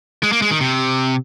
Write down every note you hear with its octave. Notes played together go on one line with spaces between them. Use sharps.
G#3
A#3
G#3
D#3
C3